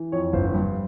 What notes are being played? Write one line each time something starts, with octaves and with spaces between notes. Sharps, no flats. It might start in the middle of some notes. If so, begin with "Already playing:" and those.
Already playing: E3
F2 C#5
G1 C5
G2